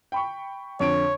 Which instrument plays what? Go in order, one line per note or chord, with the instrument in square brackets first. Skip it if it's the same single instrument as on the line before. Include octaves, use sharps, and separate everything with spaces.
[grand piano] G5 B5 C#6
[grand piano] F2 D3 D7 [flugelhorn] C#5